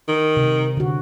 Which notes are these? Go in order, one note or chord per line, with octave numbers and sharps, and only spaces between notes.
D#3
C3
D3 F#4